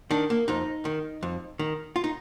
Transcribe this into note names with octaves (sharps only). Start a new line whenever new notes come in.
D#3 D4
A#3
F2 D#4
D#3
F2
D#3
F4
D#4